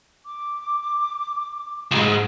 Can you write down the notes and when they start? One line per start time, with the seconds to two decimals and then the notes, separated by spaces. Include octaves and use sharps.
0.24 D6
1.91 C#2 G#2